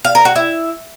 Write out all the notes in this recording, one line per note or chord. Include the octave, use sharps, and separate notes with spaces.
F5
A#4
F#4
E4